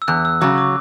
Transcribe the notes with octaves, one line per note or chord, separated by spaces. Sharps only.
E6
E2 F#6
E6
C#3 F#3 D6
D6